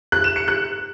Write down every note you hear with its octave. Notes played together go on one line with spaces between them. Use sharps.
F#6
E7
C#7
F#6